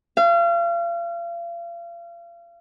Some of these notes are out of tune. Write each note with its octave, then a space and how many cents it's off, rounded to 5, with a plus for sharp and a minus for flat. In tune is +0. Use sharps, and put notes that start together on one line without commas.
F5 -35